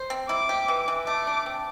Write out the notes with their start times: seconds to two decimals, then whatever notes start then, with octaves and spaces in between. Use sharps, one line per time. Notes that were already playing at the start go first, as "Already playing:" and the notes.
Already playing: C5
0.10 C4
0.29 E4 D6
0.49 G4
0.68 E3
0.88 E3
1.07 A3 D6
1.27 D4
1.46 C4